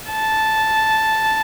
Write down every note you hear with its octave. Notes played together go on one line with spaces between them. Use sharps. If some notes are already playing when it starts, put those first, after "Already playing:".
A5